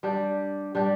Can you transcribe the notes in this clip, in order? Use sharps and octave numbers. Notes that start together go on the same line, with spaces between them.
G3 D4 G4
G3 D4 G4